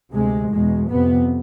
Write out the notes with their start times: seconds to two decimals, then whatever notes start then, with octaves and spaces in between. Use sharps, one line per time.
0.13 D2 C3 G#3
0.50 E2 B2 G#3
0.88 F2 C3 B3